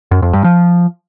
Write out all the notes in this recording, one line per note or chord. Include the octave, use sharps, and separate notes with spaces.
F#2
F2
G2
F3